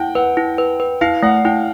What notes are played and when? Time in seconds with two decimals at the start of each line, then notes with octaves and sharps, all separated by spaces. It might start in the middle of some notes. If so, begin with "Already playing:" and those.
Already playing: E4 F#5 G5
0.15 B4 F#5
0.37 E4
0.58 B4
0.80 B4
1.01 E4 F5
1.23 A3 F#5
1.45 E4 G5